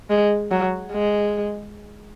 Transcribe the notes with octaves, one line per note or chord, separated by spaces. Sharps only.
G#3
F#3
G#3